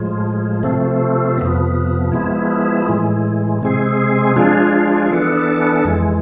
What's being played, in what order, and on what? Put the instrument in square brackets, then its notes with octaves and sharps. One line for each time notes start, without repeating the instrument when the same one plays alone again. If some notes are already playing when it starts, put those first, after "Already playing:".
Already playing: [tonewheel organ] A2 F3 G#3
C3 F3 A3 C4
F2 C3 F3 B3
F3 G#3 B3 E4
A2 E3 G#3
C3 G#3 C4 G#4
F3 G#3 D4 F4 G#4
E3 B3 D4 A4
F2 E3 G#3